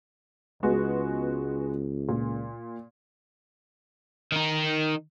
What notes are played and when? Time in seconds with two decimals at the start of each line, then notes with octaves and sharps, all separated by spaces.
0.63 C#2 G#3 B3 F#4
2.09 A#2
4.32 D#3 D#4